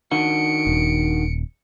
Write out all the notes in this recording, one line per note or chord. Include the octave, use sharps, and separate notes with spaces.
D#3 D4 F#4 C#7 D7
D#1